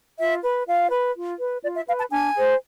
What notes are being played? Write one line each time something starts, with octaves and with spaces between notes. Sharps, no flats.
F4 E5
B4
F4 F5
B4
F4
B4
F4 D5
E5
B4 F5
A5
D4 G#5
G#4 C5